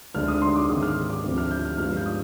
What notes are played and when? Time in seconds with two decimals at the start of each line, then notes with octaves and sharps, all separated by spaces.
0.14 D2 D3 G#3 D4 F6
0.28 D#6
0.42 C6
0.56 D6
0.69 G#1 G#2 D#3 D#6
0.82 F6
1.10 D6
1.24 D2 C3 F3
1.37 F6
1.51 G6
1.65 F6
1.78 G1 G2 F3 G#3 F6
1.96 G6
2.06 D#6